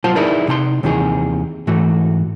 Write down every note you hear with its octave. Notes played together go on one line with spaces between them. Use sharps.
B1 F#3 F4 C5 A5 C6
D#4 E4 G#4 A#4 B4 D5
C3 D#4 A5 C6
D#2 C3 D#3 E3 G#4
G#2 E3 A3 F#4